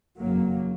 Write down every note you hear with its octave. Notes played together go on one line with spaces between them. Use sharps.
F#1 F2 C#3 F#3 A#3